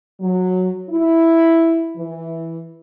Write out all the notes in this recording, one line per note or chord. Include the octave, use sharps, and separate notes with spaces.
F#3
E4
E3